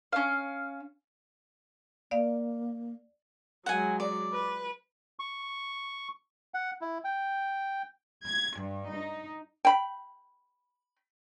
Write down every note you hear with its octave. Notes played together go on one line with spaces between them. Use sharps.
C#4 F5
A#3 D5 F5
F#3 G#3 F#5 G#5
D5
B4
C#6
F#5
E4
G5
G#6
G2
D#4
G5 B5